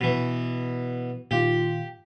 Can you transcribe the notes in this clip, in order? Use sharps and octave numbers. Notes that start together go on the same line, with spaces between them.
B2 E3
A#2 D#3 F4 G4